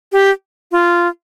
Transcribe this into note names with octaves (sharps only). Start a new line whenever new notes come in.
G4
F4